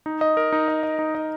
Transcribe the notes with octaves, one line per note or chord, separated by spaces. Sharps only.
D#4
D#5
A#4
D#4
D#5
D#5
D#4
D#5